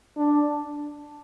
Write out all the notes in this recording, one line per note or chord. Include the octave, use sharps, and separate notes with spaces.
D4